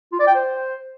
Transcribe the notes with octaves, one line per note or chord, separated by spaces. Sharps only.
F4
D5
G5
C5